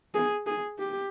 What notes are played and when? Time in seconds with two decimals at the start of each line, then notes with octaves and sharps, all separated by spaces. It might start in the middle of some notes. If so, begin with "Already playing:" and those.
0.15 G#4
0.47 G#4
0.79 G4